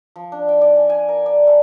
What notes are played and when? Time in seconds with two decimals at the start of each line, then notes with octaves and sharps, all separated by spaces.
0.16 F3
0.32 D4
0.49 G5
0.61 D5
0.76 G#5
0.90 G#5
1.09 A#4
1.26 D5
1.47 A3